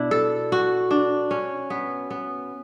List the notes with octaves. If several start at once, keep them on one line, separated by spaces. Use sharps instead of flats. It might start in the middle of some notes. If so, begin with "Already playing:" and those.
Already playing: B2 D4 E4
A4
F#4
D4
C#4
B3
B3